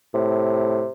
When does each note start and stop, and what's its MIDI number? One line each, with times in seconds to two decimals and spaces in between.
0.14 0.84 45
0.14 0.92 48